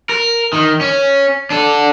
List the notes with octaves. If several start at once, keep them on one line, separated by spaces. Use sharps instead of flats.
A#4
D#3
C#4
D4 A4